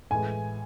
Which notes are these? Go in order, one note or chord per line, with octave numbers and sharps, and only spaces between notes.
A2 E3 G#3 G#5